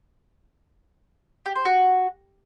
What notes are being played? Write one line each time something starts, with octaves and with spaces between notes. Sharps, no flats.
G4
C5
F#4